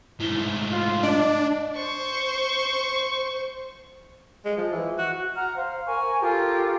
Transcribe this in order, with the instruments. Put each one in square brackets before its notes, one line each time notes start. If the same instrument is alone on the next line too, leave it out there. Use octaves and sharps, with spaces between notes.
[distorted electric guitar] G#2 A3 [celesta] E4 G7
[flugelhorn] F4
[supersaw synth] D4 [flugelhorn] D5 [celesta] D#5 D7 F#7
[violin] C5 C#6
[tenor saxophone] G#3
F3
E3
F#4
[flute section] F#5 A#5 F6
C5 F5
A#4 G#5 C#6
F4 G4 A4 A#4